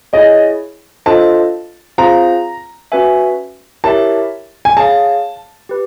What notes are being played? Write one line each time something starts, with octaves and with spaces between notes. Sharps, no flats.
E4 G#4 C#5 D#5
D4 F4 A4 C5 D#5 A5
C4 F4 G#4 C5 F5 A#5
C#4 F#4 B4 E5 G#5
E4 G4 A#4 C#5 E5 A5
G#5
G#4 C#5 F5 A5
G4 B4